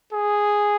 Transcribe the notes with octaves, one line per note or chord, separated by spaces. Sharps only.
G#4